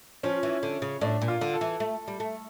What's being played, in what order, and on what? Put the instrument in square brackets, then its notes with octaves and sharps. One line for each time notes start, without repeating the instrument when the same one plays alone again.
[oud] F3 [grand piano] C#4
[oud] E3
D3
C#3
[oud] A2 [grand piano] D4
[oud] A#2
[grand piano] F4
[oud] D3
[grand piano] A4
[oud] E3
A3
G3
A3